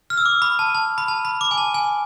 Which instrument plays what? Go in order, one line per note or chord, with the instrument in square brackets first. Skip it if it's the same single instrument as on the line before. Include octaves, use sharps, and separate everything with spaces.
[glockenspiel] F6
E6
D6
B5
A5
A5
B5
A5
B5
D6
G#5
A5
G#5